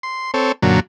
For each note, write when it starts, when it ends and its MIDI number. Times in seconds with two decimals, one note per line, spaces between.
0.03 0.31 84
0.34 0.52 60
0.34 0.52 69
0.34 0.52 73
0.62 0.80 42
0.62 0.80 46
0.62 0.80 50
0.62 0.80 54